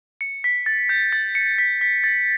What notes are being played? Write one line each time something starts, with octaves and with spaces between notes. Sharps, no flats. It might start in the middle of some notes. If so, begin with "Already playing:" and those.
C#7
B6
A6
G6
A6
C#7
B6
B6
A6